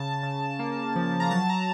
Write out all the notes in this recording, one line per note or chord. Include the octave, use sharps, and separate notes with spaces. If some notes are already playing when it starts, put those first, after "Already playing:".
Already playing: C#3 A5
C#3
A#3
F3
A#5
F#3 A5
A#5